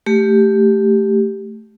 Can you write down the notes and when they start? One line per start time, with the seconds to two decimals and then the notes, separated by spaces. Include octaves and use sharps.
0.06 A3 G4